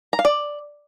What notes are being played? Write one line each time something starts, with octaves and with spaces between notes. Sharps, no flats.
A#5
F5
D5